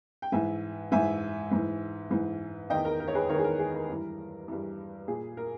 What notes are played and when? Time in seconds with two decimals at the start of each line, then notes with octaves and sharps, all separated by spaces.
0.22 G5
0.32 G#2 E3 E5 G#5
0.92 G#2 E3 E5 G#5
1.52 G#2 E3
2.11 G#2 E3
2.70 E2 D#3 D#5 G5
2.85 A#4
3.00 A#4
3.08 C#5
3.15 G#4 B4
3.29 E2 D#3 A#4 C#5
3.39 G#4
3.44 A#4
3.59 G#4
3.74 A#4
3.89 G2 E3
4.48 G2 E3
5.08 A#2 G#4
5.37 A#4